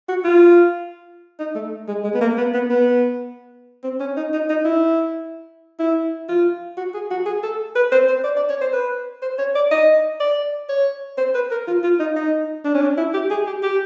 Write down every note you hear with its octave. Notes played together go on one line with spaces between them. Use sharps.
F#4
F4
D#4
A3
G#3
G#3
B3
A#3
B3
B3
B3
C4
C#4
D#4
D#4
D#4
E4
E4
F4
F#4
G#4
F#4
G#4
A4
B4
C5
C5
D5
D5
C#5
C5
B4
C5
C#5
D5
D#5
D5
C#5
C5
B4
A#4
F4
F4
D#4
D#4
D4
C#4
D4
E4
G4
G#4
G4
G4